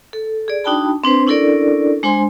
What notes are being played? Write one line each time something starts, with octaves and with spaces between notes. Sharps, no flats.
A4
G#4 D5
D4 D#4 F#4 G5 A5 B5
C4 D4 B4 C5
C#4 D4 E4 A4 A#4 D5
G#3 D4 C5 G#5 C6